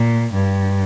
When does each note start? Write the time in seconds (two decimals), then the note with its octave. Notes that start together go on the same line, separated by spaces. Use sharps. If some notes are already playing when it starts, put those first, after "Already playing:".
Already playing: A#2
0.34 G2